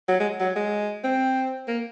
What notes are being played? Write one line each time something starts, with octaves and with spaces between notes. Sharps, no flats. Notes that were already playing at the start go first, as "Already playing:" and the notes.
F#3
G#3
F#3
G#3
C4
A#3